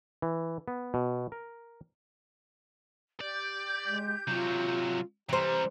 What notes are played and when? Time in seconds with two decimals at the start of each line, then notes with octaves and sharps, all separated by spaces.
0.22 E3
0.68 B3
0.94 B2
1.32 A#4
3.20 G4 D5 G6
3.87 G#3
4.27 C3 F#3 F4
5.29 C3 E3 G3 G4 C5 A#5